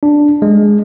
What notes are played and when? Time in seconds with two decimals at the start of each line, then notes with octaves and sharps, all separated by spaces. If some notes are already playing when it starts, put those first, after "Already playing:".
0.03 D4
0.42 G#3